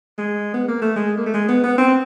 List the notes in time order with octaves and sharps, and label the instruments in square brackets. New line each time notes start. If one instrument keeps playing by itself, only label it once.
[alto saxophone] G#3
B3
A#3
A3
G#3
A#3
A3
G#3
B3
B3
C4